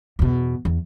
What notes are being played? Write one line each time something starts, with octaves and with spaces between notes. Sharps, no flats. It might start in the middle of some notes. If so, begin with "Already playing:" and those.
E2 B2
E2